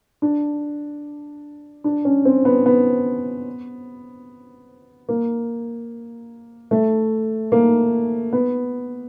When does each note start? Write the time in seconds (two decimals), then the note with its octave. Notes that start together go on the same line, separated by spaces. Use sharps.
0.22 D4
1.84 D4
2.05 C#4
2.25 C4
2.45 B3
2.66 B3
5.09 A#3
6.71 A3
7.52 A#3
8.33 B3